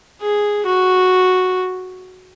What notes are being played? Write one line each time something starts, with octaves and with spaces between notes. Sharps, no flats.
G#4
F#4